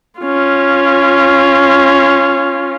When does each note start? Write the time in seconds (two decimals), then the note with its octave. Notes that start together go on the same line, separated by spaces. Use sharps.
0.20 C#4 F4